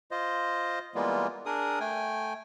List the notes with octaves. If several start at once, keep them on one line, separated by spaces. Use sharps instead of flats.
F4 C5 D#5
E3 G3 G#3 A#3 B3 F4
D4 G#4 A#4 D#6
A3 G5 G#5